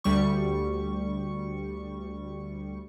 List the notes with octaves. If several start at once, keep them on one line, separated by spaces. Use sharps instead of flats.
D2 G3 C#6